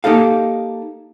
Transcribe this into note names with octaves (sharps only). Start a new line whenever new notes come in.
A#3 D#4 G4 A4 F5